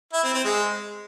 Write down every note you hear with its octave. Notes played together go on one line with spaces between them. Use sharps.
E4
C4
C4
G#3